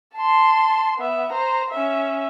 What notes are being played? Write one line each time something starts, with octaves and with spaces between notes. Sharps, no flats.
A5 C6
B3 E5
C5 A#5
C#4 E5